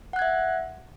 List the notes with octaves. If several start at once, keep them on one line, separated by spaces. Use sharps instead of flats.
E5 F#5 F#6 G#6